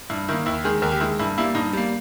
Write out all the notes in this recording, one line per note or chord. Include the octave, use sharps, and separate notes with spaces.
G2 E4
D#3 A#3 E4
D#2 E4
D#3 G#3 G#4
D#2 A#4
G4
D#3 G#3 E4
G2 E4
G3 A#3 E4
G2 D#4
G3 A#3